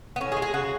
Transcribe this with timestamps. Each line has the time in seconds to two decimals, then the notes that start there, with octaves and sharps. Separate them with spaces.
0.16 B3
0.20 A2 C#4
0.32 G#4
0.37 G#3
0.42 G#4
0.54 C#3 F#4